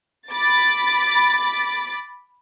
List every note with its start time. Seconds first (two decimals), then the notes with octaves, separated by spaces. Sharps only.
0.31 B5 D6 A6